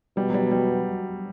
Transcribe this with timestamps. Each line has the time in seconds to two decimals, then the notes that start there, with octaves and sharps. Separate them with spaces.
0.17 B2 G3
0.30 F#3
0.34 G3
0.51 G3